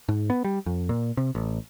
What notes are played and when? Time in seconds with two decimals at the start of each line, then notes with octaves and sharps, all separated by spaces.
0.09 G#2
0.30 B3
0.45 G3
0.66 F2
0.89 A#2
1.17 C3
1.35 A1